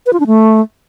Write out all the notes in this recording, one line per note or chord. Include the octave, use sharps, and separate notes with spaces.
B4
F4
D4
A3